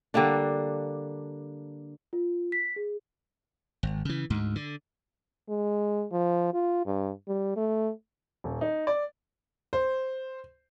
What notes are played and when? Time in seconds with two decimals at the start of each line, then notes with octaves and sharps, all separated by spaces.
0.14 D3 G3 A#3 D4
2.13 F4
2.52 B6
2.76 G#4
3.83 G#1
4.05 C#3 E3
4.30 D2 G#2
4.56 D3
5.49 G#3
6.12 F3
6.54 F4
6.86 G2
7.27 G3
7.56 A3
8.44 D#1
8.61 D#4
8.87 D5
9.73 C5